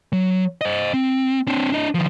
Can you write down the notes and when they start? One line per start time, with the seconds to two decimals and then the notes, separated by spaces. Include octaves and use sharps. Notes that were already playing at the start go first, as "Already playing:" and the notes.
0.13 F#3
0.61 C5 D#5
0.94 C4
1.47 C4 D4
1.72 D4 D#5
1.94 D#3 F3